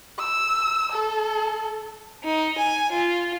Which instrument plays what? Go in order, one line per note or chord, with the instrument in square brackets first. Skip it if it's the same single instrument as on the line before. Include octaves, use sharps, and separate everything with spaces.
[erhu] E6
A4
[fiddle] D#4
G#5
F4